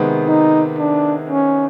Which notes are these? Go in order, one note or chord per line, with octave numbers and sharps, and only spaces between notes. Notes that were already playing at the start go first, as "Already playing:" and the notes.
Already playing: C3 D#3 G#3 B3
D#4
D4
C#4